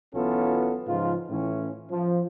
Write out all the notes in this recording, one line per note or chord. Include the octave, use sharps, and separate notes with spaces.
B1 E3 B3 C#4 F4 A4
G#2 C#3 F3 F4
A2 E3 C#4
F3